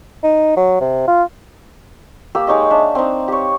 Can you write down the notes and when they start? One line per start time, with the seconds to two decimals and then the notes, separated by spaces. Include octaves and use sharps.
0.24 D#4
0.57 F#3
0.81 C3
1.08 F4
2.35 A#3 G4 E6
2.47 G#3 D#4 C#5 D#5
2.70 D4 E5
2.95 C4 D#4
3.28 G4 C#5